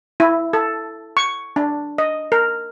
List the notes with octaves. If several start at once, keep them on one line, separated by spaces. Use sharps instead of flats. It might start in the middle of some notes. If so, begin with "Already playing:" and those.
E4
A4
C#6
D4
D#5
A#4